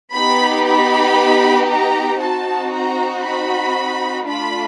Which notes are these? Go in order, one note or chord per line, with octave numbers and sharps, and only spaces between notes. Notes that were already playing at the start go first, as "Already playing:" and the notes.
B3 D#4 G4 B5
B5
A#5
C4 D#4 F#4 A5
A#5
B5
A3 D4 F4 B5